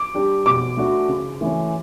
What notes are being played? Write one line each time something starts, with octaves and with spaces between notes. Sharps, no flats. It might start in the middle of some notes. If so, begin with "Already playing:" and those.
Already playing: D6
G3 D4 G4
B2 D6
A3 D4 F#4
C#3
E3 A3 C#4